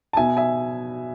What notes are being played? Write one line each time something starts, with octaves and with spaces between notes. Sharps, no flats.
A5
B2 E5 G#5
E5 G#5